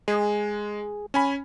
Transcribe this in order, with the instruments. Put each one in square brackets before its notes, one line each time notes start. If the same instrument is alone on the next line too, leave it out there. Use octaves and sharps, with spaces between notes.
[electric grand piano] G#3 [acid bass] G#4
[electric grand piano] C#4 G#5 B5